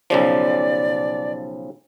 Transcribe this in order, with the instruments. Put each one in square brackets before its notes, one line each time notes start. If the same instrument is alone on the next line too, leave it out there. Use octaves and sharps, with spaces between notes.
[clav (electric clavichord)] B1 C#3 F3 [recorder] D5